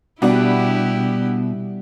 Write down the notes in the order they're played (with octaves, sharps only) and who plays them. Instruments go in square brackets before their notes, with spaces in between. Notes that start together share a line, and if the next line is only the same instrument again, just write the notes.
[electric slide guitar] B2 [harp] G3 [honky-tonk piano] B3 D4 F#4 [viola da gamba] E4 G4